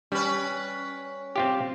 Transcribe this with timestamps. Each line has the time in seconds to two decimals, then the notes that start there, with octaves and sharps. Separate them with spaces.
0.12 G3 C#4 B4
1.36 C4 F4 G4